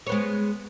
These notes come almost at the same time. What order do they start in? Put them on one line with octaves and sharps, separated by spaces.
C#5 B3 G#3